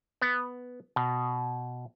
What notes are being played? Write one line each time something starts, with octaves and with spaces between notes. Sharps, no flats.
B3
B2